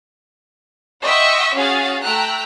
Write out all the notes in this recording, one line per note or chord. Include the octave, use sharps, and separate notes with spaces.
D#5 E5 F#5 G5 C6 C#6
C#4 F#4 G#4 F5 A6
A3 G5 A#5 E6 F#6